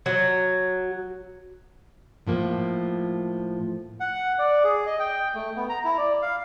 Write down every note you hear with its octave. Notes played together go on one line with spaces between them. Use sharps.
F#3
A2 F3 A#3
F#5
D5
G#4
D#5
G5
A3
B3
A#5
E4
D5
F5